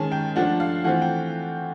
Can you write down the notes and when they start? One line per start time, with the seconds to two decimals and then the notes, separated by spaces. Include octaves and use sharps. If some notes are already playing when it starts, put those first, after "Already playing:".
Already playing: D#3 G#3 C#4 A5
0.12 G5
0.36 F3 A3 D4 F4 F#5
0.60 F5
0.84 E3 A3 C4 F4 F#5
1.02 G5